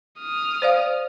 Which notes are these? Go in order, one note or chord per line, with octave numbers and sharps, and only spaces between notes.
D#6 F6
C5 D5 F5